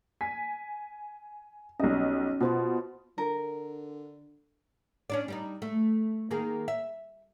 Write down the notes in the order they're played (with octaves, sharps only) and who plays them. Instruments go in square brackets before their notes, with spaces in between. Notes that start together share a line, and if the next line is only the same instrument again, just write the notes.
[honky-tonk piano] G#5 B6
[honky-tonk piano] B1 G3 D#5 [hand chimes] C#4
[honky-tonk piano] B2 [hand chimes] F4 C5 C6
[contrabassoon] D3 [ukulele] A#4
[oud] C#4 D4 D5
G3 D4 D#4
A3
D#3 A#3 G#4
E5